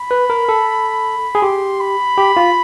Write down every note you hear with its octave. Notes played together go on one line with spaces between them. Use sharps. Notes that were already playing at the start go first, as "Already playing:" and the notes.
Already playing: B5
B4
A#4
A4
G#4
G4 C6
B5
G4
F4